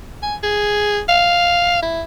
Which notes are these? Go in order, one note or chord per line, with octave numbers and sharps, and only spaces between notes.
G#5
G#4
F5
E4